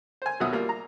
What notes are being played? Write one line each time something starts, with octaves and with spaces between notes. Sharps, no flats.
C5 G#5
D#2 B2 F#3 F#4 E5 D#6
G3 A#3 F4
A#5